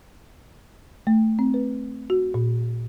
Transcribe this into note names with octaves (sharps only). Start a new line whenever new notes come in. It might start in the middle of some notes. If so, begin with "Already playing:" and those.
A3
C4
B4
F#4
A#2